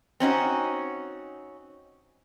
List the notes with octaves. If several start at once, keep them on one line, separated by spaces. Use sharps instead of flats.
C4 C#4 D#4 F#4